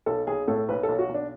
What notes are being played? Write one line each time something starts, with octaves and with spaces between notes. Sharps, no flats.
B1 A4
B1 G#4
A2 A4
B1 B4
A4
B1
F#4
B1
D4